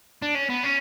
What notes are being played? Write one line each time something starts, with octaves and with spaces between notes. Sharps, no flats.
D4
C#4
B3
C#4